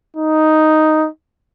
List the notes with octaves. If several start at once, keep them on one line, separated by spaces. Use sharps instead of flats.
D#4